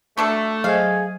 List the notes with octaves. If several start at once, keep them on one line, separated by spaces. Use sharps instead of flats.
F#3 A3 D4 A4
F#3 G#4 C5 D#5 F5